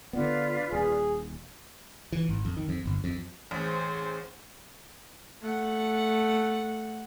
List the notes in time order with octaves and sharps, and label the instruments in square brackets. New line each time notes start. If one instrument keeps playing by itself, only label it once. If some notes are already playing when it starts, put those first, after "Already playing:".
[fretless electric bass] D3 B3 [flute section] F4 B4 D5
[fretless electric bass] D#1 [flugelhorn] G#4
[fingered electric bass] E3
G#1
F2
D#3
F2
G1
F2
[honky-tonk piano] A1 [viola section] G#4 C5
[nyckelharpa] A3 F#5